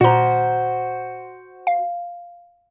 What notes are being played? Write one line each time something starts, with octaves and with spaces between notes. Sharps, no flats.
A#2 F#4 C5 A#5
F5